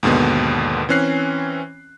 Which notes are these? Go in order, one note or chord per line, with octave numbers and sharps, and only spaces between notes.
D#2 G#2 B2 D3 B3
E3 C4 C#4 F#6 C7